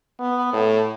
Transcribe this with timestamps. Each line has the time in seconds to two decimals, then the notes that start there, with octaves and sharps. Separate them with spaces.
0.20 B3
0.53 A2